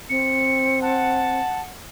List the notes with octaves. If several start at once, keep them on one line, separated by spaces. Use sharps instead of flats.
C4 C#7
F#5 A5